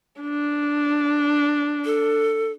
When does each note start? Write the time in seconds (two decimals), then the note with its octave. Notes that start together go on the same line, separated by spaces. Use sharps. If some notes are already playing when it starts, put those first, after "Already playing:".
0.21 D4
1.85 A4